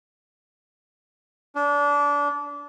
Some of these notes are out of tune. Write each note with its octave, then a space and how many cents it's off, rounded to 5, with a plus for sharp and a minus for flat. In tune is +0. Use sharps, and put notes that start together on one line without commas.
D4 -25